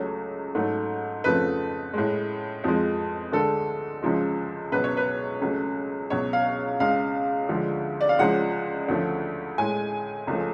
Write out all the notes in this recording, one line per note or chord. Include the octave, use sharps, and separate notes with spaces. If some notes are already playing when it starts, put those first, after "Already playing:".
Already playing: C#2 C#3 F#3 A3 C#5
G#2 F#3 A3
F2 C#3 F3 A3 B4
A2 G#3
F2 F3 G#3
D2 D3 G#3 A4
C#2 C#3 F3 G#3
C#2 B2 F#3 B4
C#5
B4
C#2 C#3 F#3 A3
C#2 B2 F#3 C#5
F5
C#2 C#3 G#3 F5
D2 D3 F3 G#3
D5
F5
C#2 C#3 F3 G#3 F#5
D2 C#3 F3 A3
A2 G#3 G#5
C#2 C#3 F3 A3